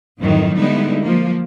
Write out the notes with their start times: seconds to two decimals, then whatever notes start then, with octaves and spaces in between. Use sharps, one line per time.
0.20 F2 G#2 D#3 E3 F#3
0.56 D3 G3 G#3 B3 D#4 E4
1.02 F3 A#3